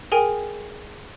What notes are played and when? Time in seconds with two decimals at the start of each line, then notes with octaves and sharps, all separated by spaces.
0.12 G#4 A#4 G5 G#5